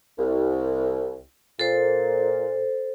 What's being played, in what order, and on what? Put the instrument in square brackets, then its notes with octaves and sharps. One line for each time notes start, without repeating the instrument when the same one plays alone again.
[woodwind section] C2
[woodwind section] A#2 [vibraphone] A4 C5